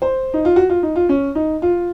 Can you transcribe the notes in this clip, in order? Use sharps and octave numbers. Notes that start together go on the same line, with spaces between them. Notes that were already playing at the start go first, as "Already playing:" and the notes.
C5
D#4
F4
F#4
F4
D#4
F4
C#4
D#4
F4